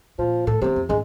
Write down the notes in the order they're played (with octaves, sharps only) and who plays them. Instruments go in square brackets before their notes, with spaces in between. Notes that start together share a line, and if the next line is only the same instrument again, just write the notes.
[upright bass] A#2 [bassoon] F3
[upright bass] A2 [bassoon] A4
[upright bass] D#2 B3 [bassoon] C3
[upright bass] F2
[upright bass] G#2 C#4 [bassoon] G#3